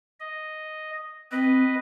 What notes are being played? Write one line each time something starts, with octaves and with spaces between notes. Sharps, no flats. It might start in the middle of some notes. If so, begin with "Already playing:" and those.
D#5
C4 B4 D#5